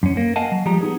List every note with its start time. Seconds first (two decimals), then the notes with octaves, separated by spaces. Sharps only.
0.03 F#2 C#4
0.17 A#3
0.36 A#4 D#5 F5 F#5 G#5 A5
0.52 F#3
0.66 F3 G3 G#3 G4 A#5
0.81 B3 D#4 G#4